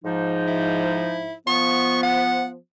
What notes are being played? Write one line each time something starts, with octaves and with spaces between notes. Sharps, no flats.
G#2 F3 D#4
E4
F3 B3 C#6
F#5